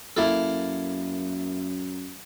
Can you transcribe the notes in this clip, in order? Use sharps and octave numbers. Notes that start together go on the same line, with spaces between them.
F#2 A#3 E4 A4